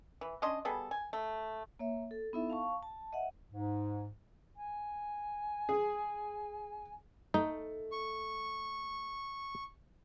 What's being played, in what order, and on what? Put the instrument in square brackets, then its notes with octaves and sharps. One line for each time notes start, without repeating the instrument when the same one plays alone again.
[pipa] E3
C#4 D4 D#5 C6
G3 B3 G#4 A4
G#5
A3
[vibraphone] A#3 C#5 E5
A4
B3 D#4 E4 A4 E5
F5 A5 C#6
A5
D#5 E5 F#5
[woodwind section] G#2
[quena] G#5
[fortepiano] G#4
[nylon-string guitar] A3 [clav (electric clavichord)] D#4
[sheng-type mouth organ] C#6